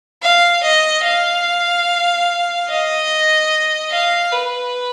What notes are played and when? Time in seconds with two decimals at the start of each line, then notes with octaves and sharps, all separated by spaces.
0.22 F5
0.63 D#5
1.04 F5
2.68 D#5
3.91 F5
4.32 B4